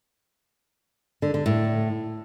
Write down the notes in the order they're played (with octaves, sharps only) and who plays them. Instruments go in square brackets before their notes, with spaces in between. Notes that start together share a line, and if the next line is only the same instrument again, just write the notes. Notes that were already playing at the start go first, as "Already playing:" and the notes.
[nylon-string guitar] D3
D3
A2